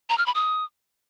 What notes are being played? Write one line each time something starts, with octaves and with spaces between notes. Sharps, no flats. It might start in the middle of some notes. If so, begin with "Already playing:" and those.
A#5
F6
B5
D#6